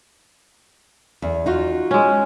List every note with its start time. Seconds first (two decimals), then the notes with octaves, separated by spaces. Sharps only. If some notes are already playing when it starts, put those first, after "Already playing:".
1.22 E2
1.46 D#4 F4 F#4
1.91 G#3 C#4